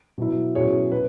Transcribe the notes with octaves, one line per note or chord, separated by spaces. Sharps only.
B2 F#3 E4
B2 F#3 C#4 E4 G#4 C#5
B2 B4